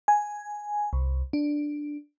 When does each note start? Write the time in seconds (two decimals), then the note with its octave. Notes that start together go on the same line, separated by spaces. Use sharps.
0.08 G#5
0.93 C2
1.33 D4